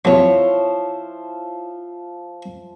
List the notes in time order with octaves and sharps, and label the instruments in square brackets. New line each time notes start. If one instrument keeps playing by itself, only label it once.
[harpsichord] C3 F#3 [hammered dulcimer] F3 C5 E5 [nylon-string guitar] E4 C#5